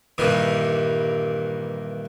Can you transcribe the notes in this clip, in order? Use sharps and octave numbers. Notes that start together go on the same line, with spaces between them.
G2 A#2 D#3 E3